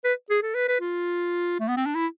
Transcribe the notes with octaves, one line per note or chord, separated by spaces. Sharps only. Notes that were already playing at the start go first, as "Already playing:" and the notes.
B4
G#4
A4
B4
B4
F4
A3
B3
C4
D4
E4